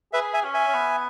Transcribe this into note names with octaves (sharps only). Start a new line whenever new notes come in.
G#4 B4 E5
E5 G#5
C#4
E5 G#5
C#4
B3